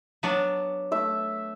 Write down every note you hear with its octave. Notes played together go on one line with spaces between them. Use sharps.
F#3 B3 D4
A3 E5